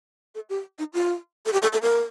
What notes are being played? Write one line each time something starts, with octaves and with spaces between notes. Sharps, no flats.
A4
G4
D#4
F4
A4
G4
A4
A4
A#4